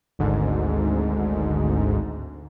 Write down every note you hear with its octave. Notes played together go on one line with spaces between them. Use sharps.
G#1 D2 G#2